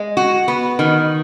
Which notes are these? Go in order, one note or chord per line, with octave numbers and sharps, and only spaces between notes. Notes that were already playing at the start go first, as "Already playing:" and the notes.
Already playing: G#3
F#4
B3
D#3